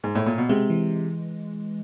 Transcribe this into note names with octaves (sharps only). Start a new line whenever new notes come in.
G#2
A2
A#2
B2
C3 G#3
E3